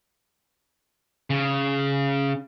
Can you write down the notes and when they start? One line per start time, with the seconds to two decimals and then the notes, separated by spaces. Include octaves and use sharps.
1.30 C#3